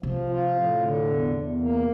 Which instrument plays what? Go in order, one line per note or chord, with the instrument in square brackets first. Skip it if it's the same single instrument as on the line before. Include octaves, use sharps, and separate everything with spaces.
[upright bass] C3 [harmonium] F3
[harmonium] F4
A2
D3
E2
E2
A#3